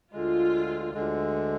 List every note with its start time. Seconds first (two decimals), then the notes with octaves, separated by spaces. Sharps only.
0.13 D2 D3 G#3 F4
0.93 D2 D3 G#3